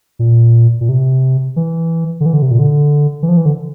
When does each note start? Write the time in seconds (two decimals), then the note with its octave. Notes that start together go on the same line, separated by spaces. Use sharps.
0.19 A#2
0.81 A#2
0.89 C3
1.56 E3
2.20 D3
2.26 E3
2.34 D3
2.42 C3
2.51 A#2
2.59 D3
3.23 E3
3.29 F3
3.37 E3
3.46 D3